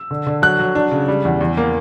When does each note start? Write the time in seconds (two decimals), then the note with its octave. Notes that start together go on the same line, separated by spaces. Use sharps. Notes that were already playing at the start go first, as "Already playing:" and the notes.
Already playing: E6
0.11 D3
0.26 D3
0.42 F#3 F#6
0.59 F#3
0.75 D4
0.91 C#3
1.08 G3
1.25 E2
1.41 E2
1.57 A#3